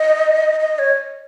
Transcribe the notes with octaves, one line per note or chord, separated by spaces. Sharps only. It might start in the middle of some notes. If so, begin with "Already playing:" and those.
Already playing: D#5
D#5
C#5